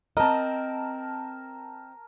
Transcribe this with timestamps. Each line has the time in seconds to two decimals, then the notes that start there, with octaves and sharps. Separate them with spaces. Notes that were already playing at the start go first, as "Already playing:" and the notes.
0.17 C4 A#4 D#5 A5